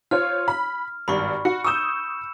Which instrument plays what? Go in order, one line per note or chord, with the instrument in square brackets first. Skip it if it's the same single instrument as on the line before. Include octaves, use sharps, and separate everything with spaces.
[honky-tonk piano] F4 C5 C#5 [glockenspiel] F6
[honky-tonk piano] B5
[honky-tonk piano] G#1 G2 [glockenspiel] B5 C#6
[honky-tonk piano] F#4 [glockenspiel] C#7
[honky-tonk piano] C#6 D#6 G6 [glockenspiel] E6 E7